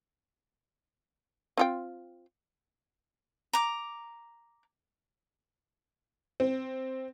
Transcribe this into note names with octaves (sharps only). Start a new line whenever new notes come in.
C4 F4 G5
A#5 D6
C4